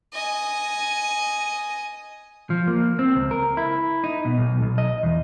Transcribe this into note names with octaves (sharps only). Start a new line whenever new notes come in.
D#5 G#5
F3
A#3
C4
C#2
A#4
E4
D#4
B2
B1
B1
D#5
E2